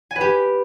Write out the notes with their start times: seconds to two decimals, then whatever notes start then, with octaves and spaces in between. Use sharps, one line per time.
0.11 G#5
0.16 B4
0.21 G4